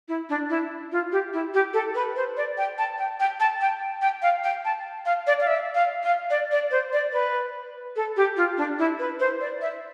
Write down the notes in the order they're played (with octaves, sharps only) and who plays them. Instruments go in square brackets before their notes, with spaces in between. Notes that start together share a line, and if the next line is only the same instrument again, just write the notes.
[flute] E4
D4
E4
F4
G4
E4
G4
A4
B4
C5
D5
G5
A5
G5
G5
A5
G5
G5
F5
G5
A5
F5
D5
F5
E5
F5
F5
D5
D5
C5
D5
B4
A4
G4
F4
D4
E4
B4
C5
D5
E5